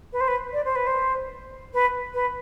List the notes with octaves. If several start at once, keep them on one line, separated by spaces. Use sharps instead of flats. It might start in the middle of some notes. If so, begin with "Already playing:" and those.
B4
C5
B4
D5
C5
B4
C5
B4
B4